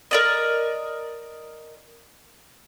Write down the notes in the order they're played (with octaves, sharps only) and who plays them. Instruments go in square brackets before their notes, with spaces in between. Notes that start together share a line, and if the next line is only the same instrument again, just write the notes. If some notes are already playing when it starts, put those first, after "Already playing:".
[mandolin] A#4 D5 D#5